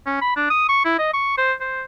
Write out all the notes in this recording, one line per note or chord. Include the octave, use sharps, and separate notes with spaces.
C#4
B5
D4
D#6
C#6
E4
D#5
C#6
C5
C5